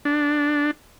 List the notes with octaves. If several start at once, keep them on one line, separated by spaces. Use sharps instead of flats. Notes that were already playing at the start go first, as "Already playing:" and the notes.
D4